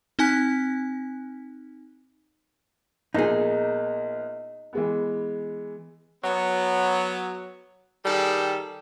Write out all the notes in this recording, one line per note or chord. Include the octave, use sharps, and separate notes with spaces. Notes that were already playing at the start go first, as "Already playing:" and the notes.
C4 D#4 G#5 F#6 B6
A#1 A#3 B3 D#4 G#4
E3 G#3 B3
F#3 B3
D#3 G3 G#4 A4